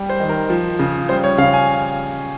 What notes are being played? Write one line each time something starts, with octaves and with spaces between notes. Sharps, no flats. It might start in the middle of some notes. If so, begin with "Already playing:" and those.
Already playing: G3
C5
D#3
A#4
F3
C#3
G3 C5
C#5
C#3 F5
G#5